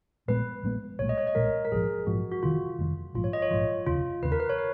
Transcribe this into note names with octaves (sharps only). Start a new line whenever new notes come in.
A#1 A#2 G#3 B3 B4
A#1 A#2 G#3 B3
B1 A#2 G#3 C#5
D#5
C#5
D#5
B1 A#2 G#3 A#4
A#4
A#1 G#2 F3 G#4
A#1 G#2 F3 F#4
F#4
F1 F2 D#3 F4
F1 F2 D#3
A#1 G#2 F3 F4
C#5
D#5
C#5
A#1 G#2 F3 F4
F1 D#2 C#3 F4
F1 D#2 C#3 B4
A#4
B4
C#5
B4